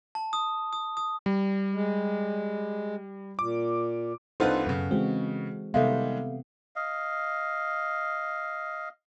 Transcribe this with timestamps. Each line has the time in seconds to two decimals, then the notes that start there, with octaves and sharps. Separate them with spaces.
0.15 A5
0.33 D#6
0.73 D#6
0.97 D#6
1.26 G3
1.73 G#3
3.39 A#2 D6
4.40 C2 D4 D#4 F4 A4 B4 C5 F#5
4.66 F#2 C#3 B3
4.91 E3 G#3 C4 F#4
5.74 C3 D#3 G3 G#3 B3 A4 E5 F5
6.76 D#5 F5